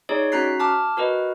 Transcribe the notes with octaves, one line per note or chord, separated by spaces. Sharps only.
D#4 G#4 C#5 D5
C#4 F#4 A#5 F#6 B6 C7
A5 D6 F6
F#4 A#4 B4 D#5